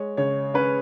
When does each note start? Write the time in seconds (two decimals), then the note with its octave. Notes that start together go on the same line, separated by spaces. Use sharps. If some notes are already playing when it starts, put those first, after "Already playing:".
Already playing: G#3 C#5
0.17 C#3 C#5
0.54 C#4 B4